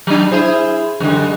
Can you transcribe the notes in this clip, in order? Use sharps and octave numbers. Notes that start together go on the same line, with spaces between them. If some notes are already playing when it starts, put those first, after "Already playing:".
F#3 D4
E4 G#4 C5
F#2 D3 G#3